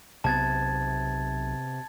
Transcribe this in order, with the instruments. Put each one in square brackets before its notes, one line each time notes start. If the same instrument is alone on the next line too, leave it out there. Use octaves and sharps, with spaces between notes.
[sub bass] B1 [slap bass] C3 B3 [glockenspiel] A5 G#6 A6